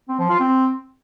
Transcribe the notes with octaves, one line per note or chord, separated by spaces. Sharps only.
C4
F3
F4
C4